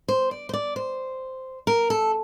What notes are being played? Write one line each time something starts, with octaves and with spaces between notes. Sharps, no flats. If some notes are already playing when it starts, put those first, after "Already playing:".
C5
D5
C5
D5
C5
A#4
A4